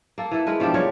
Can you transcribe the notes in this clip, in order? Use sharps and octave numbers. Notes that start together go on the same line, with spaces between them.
A#3 A4
E3 A4
G#3 A#4 B4
B2 F3 D4 G4
G3 G#3 A#4 C#5